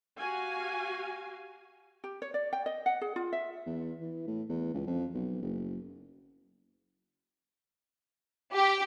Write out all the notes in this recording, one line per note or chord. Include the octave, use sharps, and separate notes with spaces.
F#4 G4 F5 G#5
G4
C#5
D5
G5
D#5
F#5
G#4
F4
E5
E2
E3
A2
E2
C#2
F2
B1
F#1
G4